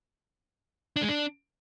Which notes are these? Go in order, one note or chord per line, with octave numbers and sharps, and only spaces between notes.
D4
G#3
D4